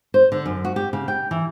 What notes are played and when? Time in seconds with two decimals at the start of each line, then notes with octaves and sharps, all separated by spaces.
0.14 C5
0.32 D3
0.46 F#2
0.65 F#4
0.76 G4
0.93 C#3
1.08 G5
1.31 E3